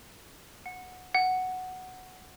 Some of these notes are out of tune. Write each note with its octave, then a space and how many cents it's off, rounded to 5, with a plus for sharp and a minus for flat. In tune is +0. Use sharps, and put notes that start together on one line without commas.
F#5 -15
F#5 +0